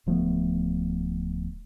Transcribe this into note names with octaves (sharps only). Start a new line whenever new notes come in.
D1 F3 A3 B3